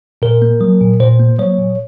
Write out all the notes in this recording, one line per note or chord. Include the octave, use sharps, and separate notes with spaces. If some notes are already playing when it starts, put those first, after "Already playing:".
A#2 A#4
A#3
F#3
A#2
A#2 C5
A#3
F#3 C#5
A#2